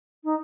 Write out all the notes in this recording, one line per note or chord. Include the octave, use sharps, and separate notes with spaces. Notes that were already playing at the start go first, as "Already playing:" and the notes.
D#4